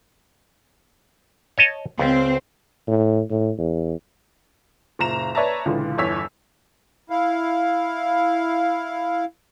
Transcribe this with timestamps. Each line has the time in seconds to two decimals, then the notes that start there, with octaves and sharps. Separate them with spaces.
1.58 C#5 D#5 A5
1.99 C#2 C4
2.87 A2
3.30 A2
3.58 E2
4.99 F#1 A#2 A#5 E7
5.35 B4 C#5 D5 E5 A5 A#5
5.66 C#2 A#2 D3 E3
5.98 G1 E2 C#5 E6 B6
7.10 E4 F5